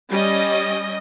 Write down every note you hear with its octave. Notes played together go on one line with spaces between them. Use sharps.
G3 C#4 D#5